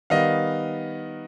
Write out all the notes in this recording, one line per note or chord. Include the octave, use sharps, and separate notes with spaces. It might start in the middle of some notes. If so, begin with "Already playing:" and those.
D#3 G3 B3 D#5 F5